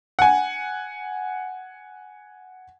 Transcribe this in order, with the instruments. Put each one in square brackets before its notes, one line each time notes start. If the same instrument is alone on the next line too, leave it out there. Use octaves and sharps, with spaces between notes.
[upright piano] F#5 G#5